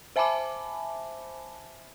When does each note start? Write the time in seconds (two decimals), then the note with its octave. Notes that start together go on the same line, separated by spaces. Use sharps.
0.16 C5 E5 G#5 A5 B5 D6